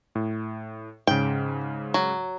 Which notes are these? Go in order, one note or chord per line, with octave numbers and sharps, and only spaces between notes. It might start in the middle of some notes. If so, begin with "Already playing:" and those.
A2
G#2 C#3 G5
F#3